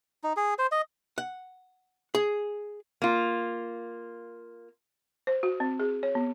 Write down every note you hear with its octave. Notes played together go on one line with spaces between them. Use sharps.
D#4
G#4
C5
D#5
F#5
G#4
A#3 F4
C5
F#4
C4
G#4
C#5
B3